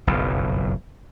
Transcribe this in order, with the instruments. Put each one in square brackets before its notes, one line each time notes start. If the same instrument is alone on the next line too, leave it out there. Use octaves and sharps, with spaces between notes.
[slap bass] F#1 B1 F2